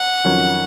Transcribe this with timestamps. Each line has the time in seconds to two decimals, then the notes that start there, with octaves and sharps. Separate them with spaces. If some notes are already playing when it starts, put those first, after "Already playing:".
Already playing: F#5
0.24 F2 D#3 F#3 C#4 F4